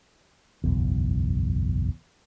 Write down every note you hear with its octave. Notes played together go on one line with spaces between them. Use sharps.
F#1 B1 E2